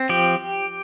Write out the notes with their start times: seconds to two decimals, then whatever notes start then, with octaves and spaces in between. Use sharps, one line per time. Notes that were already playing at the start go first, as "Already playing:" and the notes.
Already playing: C4
0.09 F3 G4